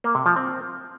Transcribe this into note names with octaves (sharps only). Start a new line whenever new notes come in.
A#3
C3
F3
C4